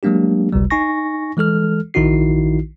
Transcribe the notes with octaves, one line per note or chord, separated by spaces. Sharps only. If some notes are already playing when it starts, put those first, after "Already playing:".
F#3 G#3 A#3 D4 G4
G1 C#2 C3 G3
D#4 G#5 C#6 A#6
E3 G#3 A4 F6
A#1 D#3 D#4 E4 F#4 C7